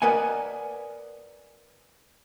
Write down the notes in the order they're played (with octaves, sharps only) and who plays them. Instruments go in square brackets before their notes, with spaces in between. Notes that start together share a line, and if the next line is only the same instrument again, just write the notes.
[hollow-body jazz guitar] A#4 B4 D5 D#5 F#5 G#5